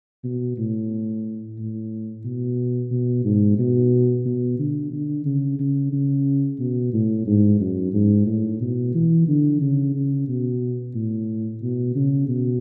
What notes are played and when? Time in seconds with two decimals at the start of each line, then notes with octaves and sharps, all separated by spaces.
0.24 B2
0.58 A2
1.58 A2
2.24 B2
2.91 B2
3.25 G#2
3.59 B2
4.26 B2
4.59 D3
4.93 D3
5.25 C#3
5.59 C#3
5.93 C#3
6.59 B2
6.93 A2
7.27 G#2
7.61 F#2
7.93 G#2
8.27 A2
8.61 B2
8.95 E3
9.28 D3
9.61 C#3
9.95 C#3
10.28 B2
10.95 A2
11.62 B2
11.95 C#3
12.29 B2